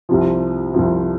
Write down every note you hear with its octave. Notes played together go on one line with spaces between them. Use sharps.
C2 C3 F3
C2 C3 F3